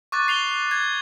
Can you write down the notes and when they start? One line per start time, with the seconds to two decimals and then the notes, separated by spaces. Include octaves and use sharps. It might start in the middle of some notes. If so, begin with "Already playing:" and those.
0.12 C#6 D6 F#6 A6
0.28 C7 F7 G7
0.71 G#6